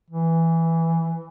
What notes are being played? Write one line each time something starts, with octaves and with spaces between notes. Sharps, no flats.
E3